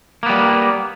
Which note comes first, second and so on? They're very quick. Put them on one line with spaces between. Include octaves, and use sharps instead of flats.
A#3 B3 G3